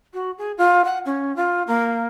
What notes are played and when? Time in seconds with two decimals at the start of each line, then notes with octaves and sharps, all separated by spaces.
0.14 F#4
0.38 G#4
0.58 F4
0.85 F#5
1.05 C#4
1.36 F4
1.67 A#3